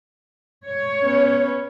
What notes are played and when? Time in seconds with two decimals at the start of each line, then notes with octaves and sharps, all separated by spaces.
0.66 C#5
1.03 B3 C#4